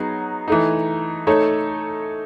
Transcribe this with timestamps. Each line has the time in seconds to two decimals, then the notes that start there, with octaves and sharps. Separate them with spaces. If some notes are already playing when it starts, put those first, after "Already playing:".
Already playing: F#3 B3 D#4 G#4
0.48 E3 A3 D#4
1.27 A3 D#4 A4 C#5